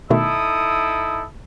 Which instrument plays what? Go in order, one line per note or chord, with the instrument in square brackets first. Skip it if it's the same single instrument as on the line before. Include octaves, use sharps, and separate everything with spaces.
[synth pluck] B2 D#3 A3 [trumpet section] D#4 E4 A4 [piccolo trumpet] D#6